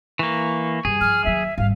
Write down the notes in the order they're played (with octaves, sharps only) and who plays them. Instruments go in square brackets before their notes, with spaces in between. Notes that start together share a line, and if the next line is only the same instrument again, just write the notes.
[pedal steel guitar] E3 A#3 [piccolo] C#6
[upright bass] G2 [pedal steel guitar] G#4
[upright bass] F3 [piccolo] F6
[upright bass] D#2 F#3 [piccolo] E5
[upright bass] G#1 G3 [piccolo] F5